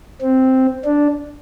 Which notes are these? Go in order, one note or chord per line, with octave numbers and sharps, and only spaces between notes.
C4
D4